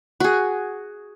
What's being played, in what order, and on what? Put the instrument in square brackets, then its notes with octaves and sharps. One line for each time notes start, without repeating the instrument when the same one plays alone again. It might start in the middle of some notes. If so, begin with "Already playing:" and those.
[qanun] F#4 G#4